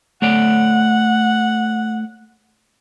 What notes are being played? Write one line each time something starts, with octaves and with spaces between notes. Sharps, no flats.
A3 C#5 D5 F#5